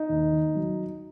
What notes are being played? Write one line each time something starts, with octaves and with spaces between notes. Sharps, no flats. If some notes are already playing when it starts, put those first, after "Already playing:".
Already playing: D#4
D#2
D#3
F#3